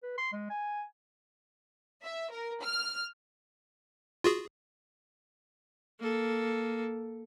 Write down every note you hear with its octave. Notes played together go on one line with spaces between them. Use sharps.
B4
C6
G#3
G#5
E5
A#4
F6
F4 F#4 G#4
A#3 A4